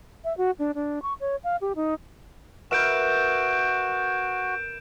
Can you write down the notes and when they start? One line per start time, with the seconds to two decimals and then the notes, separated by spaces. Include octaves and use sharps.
0.24 E5
0.37 F#4
0.59 D4
0.75 D4
1.02 C#6
1.20 C#5
1.44 F5
1.61 G4
1.76 D#4
2.71 F#4 A#4 B4 E5 G6 D7 E7